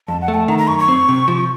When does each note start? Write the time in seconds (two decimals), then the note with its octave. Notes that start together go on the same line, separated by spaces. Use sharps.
0.08 F2 A5
0.21 F#5
0.28 A3
0.34 A5
0.48 D#3 A#5
0.58 A#5
0.68 F#2 C#6
0.79 C#6
0.88 C4
1.09 C3
1.28 F3